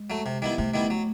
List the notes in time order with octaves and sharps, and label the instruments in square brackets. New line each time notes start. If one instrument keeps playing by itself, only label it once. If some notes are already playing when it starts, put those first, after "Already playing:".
Already playing: [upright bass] G#3
[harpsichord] F#3 A3
C3
D#3 G3 B3 E4
[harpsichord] C3 [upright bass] A3
[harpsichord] D#3 G3 B3 E4
F#3